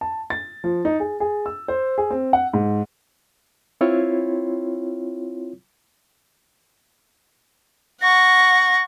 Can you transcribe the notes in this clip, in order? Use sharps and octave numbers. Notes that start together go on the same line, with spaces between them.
A5
A6
F3
D#4
G#4
G#4
E6
C5
G#4
C4
F#5
G#2
C4 E4 F4 C#5
F#5 C#6 A#6